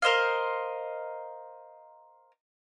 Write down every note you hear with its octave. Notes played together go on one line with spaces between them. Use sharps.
A#4 C5 D#5 F5